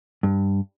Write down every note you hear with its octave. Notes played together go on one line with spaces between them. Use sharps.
G2